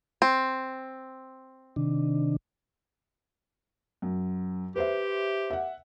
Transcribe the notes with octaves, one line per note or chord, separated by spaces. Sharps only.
C4
C3 D#3 D4
F#2
G4 B4 C5 E5
E5 F#5